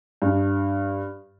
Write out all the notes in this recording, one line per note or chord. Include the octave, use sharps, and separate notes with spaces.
G2